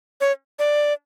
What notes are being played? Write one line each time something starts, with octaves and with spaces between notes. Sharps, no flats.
C#5
D5